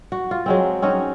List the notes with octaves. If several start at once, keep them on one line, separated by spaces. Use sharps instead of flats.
F#4
F4
F#3 G#3 C4
C4 C#4 D#4 F#4